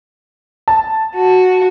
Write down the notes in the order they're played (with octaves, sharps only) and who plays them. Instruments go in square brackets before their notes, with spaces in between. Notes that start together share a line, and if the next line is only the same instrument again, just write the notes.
[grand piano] A5
[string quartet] F#4